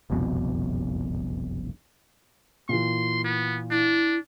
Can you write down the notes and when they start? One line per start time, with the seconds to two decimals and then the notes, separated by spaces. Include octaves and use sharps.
0.10 F#1 C2 F2 B2
2.69 A#2 E3 C6
3.24 B3
3.71 D4 E4